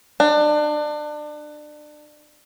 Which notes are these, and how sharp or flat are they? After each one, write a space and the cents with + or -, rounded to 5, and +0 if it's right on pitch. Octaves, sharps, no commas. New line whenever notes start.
D4 +30